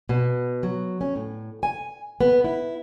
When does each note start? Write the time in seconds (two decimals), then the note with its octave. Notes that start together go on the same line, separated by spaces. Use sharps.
0.09 B2
0.63 F#3
1.01 C#4
1.16 A2
1.63 G#5
2.21 B3
2.44 E4